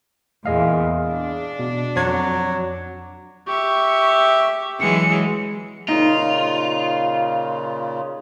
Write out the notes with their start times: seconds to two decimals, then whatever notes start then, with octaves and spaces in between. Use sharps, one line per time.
0.46 E2 A#2 G#4 D#5 F5
1.03 D4
1.59 B2
1.96 F2 F#3 G#6
3.47 G4 E5 C#6
4.80 E3 F#3 G#3 C#7
5.88 A#2 C#3 D#4 F4